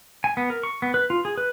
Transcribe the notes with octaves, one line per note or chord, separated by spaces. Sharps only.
G#5
B3
A#4
C#6
B3
B4
F4
G#4
B4